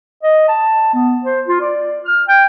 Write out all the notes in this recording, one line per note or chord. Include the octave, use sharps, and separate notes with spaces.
D#5
A5
B3
C5
F4
D5
F6
G5